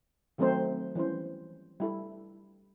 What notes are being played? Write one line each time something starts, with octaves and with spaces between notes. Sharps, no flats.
D#3 F#3 A3 C4 D#4 C5
E3 G3 C#4 C5
G3 E4 A4